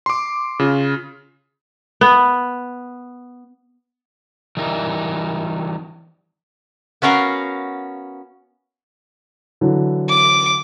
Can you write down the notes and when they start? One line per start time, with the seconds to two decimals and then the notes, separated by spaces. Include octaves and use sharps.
0.06 C6 D6
0.59 C#3 F4
2.01 B3
4.57 E3 G3 D#4 A#4
7.02 B3 C#4 F#4 A#4 F5
9.61 D3 E3 F#3
10.09 D6